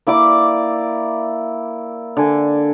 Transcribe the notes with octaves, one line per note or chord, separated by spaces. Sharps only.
A#3 E4 D5 D6
D3 G#5